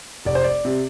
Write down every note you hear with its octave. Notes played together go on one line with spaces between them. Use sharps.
F1 D5
C5
D5
C3